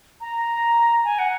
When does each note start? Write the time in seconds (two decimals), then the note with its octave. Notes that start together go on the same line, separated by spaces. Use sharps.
0.21 A#5
1.04 G#5
1.19 F#5